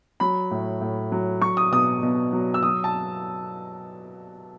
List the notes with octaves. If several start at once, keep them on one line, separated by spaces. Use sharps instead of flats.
F#3 B5
A2
A2
F#3
F#3 C#6
D#6
B2 D#6
B2
F#3
E6
F#3 D#6
A5